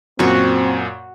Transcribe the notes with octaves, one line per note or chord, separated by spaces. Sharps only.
F#2 A#2 C4 F#4 C#6